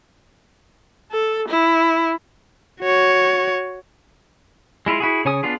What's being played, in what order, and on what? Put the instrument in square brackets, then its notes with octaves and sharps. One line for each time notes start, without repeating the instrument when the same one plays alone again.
[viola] A4
E4
[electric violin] F#4 C#5
[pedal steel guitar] G#3 E4 F4
E4 F#4 G#4
C#3 C#5 G#5 D#6
B3 D4 F4 G#4